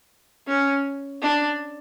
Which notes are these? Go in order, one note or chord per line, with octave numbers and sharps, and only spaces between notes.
C#4
D4